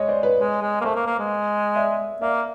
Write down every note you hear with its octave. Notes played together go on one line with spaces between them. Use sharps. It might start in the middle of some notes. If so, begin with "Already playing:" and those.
Already playing: G#3 C#5 D#5
C5 D5
B4 C#5
G#3
G#3
A#3
A3 A#4 C5
A#3
A#3
G#3
D5 E5
A#3 D5 E5